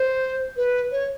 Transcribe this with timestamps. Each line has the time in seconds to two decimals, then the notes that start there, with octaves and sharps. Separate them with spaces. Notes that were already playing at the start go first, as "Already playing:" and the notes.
Already playing: C5
0.57 B4
0.92 C#5